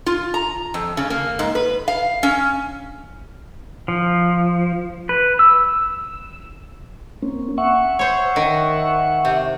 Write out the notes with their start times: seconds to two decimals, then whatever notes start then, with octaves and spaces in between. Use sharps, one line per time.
0.06 F4
0.34 A#5
0.74 F2
0.97 C#3
1.10 A#3
1.39 G#2
1.55 B4
1.88 F5
2.23 C#4
3.88 F3
5.09 B4
5.39 E6
7.22 A#3 C4 C#4
7.58 E5 F#5 C#6
7.99 C5 C#5
8.36 D#3
9.25 C3